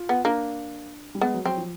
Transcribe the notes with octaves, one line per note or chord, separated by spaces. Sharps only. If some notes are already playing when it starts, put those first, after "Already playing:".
Already playing: F4
B3
A#3 D4
G3
G#3 B3
F#3
F#3 C4
F3